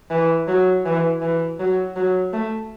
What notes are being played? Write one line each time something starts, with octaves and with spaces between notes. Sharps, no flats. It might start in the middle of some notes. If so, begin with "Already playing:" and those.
E3
F#3
E3
E3
F#3
F#3
A3